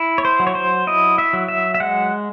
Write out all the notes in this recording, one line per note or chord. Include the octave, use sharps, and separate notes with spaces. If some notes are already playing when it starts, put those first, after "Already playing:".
Already playing: E4
C#5
C5
F#3
C#5
C5
E4 D#5
E5
F#3
E5
E5
G#3 F#5